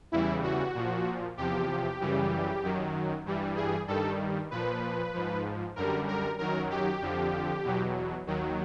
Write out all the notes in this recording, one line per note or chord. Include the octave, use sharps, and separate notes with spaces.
E2 C#3 E3 G3 E4
F#4
A#2 F3
E2 C3 F3 G4
F#2 C#3 E3 G3
F#2 D#3 F#3
G2 E3 G3
G#4
G2 D#3 G3 A4
A#2 F3 B4
G#2 F3
F#2 D3 G3 A#4
A#4
F#2 D#3 F#3 A#4
G4
F2 D3 F3
E2 B2 F#3
D#2 D#3 F#3